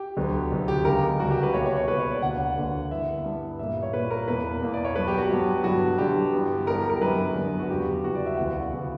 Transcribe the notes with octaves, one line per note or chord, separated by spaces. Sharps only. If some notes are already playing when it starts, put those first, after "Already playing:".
Already playing: G4
D2 D3 F#3 B3
D2 D3 F#3 B3
G4
C#2 C#3 G3 A#4
C#2 C#3 G3 F#4
G4
B4
C#2 B2 A#3 C#5
C#5
C#5
C#2 B2 A#3 B4
C#5
D5
D2 D3 A#3 F#5
D2 D3 A#3
G2 E3 B3 E5
G2 E3 B3
A#2 G3 A#3 E5
C#5
A#2 G3 A#3 B4
A#4
E2 B2 A#3 B4
E2 B2 A#3
D5
C#5
G2 F#3 B3 B4
G4
F#4
G2 F#3 B3
G2 D3 F#3 F#4
G2 D3 F#3 G4
G2 E3 B3
G2 E3 B3 A#4
G4
A#4
F#2 D3 F#3 B3 B4
F#2 D3 F#3 B3
F#4
E2 C#3 G3 G4
E2 C#3 G3 F#4
D5
E5
D2 C#3 E3 B3 F#5
D2 C#3 E3 B3